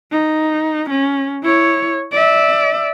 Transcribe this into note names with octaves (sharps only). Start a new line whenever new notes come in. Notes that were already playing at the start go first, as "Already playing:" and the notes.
D#4
C#4
E4 C#5
D5 E5